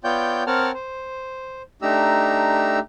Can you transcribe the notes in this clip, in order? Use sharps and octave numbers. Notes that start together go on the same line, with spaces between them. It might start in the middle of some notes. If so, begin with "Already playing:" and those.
B3 F4 C#5 D5 G5 G6
C4 A#4 C#5 F#5 A5 F6
C5
A3 D4 D#4 G4 A#5 E6